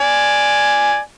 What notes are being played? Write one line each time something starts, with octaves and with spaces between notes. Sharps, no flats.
D5 G#5